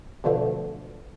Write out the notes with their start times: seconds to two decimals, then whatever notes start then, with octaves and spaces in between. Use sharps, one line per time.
0.24 B2 D3 F3 A3